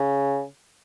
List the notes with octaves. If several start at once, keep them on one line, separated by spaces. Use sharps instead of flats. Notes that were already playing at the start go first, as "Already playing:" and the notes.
Already playing: C#3